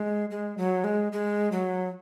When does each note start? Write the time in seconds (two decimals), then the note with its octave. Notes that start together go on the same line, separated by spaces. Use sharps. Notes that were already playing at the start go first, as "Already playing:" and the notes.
Already playing: G#3
0.31 G#3
0.58 F#3
0.84 G#3
1.12 G#3
1.52 F#3